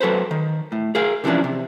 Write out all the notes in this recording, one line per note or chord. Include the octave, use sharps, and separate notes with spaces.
F#3 A4 B4 C5
D#3
A2
G#4 A#4 F5
C3 E3 F3 C#4 D4
C3